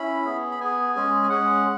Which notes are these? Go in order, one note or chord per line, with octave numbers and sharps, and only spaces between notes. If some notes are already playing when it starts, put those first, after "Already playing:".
Already playing: C#4 E4 B5
B3 G#4
B5
B3 G#4 G#5
G#3 C#4 G#4
G#5
G#3 C#4 G#4 F#5